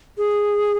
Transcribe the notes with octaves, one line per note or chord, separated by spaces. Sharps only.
G#4